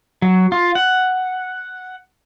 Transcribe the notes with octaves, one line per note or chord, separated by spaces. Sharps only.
F#3
F4
F#5